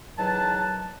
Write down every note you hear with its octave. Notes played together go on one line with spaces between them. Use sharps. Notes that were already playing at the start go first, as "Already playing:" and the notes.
E2 D#3 F#3 B4 A5